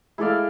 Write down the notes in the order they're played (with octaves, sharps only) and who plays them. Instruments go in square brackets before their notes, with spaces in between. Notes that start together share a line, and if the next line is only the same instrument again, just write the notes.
[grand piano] G#3 [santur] E4 A4 D5 F5